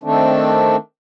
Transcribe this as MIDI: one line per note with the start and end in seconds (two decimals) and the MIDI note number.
0.04 0.76 51
0.04 0.76 57
0.04 0.76 60
0.04 0.76 62